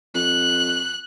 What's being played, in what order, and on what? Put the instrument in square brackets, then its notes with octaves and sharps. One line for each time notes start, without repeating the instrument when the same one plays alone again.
[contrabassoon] F2 [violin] F#6